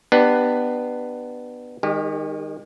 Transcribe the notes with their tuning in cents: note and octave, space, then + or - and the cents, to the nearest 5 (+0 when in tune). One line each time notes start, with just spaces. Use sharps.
B3 +0 D4 +30 G4 +0
D#3 +0 G#3 -40 G4 +15